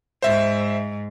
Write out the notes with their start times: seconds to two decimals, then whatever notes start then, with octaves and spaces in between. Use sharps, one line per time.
0.22 G#2 C5 E5